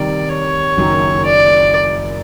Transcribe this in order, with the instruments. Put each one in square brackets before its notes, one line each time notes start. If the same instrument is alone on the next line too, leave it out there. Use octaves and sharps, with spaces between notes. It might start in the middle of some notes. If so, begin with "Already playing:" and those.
Already playing: [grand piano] C3 D#3 G3 [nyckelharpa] D5
[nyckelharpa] C#5
[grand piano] F#1 F#2 D#3
[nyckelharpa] D5